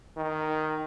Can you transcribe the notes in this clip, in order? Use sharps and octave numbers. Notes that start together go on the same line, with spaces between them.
D#3